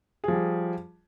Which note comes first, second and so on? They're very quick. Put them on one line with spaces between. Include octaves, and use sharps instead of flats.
G#4 F3 G3